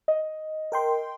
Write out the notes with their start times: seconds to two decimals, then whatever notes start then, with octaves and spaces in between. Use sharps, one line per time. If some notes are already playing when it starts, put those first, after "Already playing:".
0.08 D#5
0.72 A#4 G5 C6